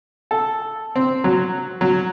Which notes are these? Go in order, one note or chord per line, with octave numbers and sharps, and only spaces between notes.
A4
C4
F#3
F#3